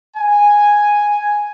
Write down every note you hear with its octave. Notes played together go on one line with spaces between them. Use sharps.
G#5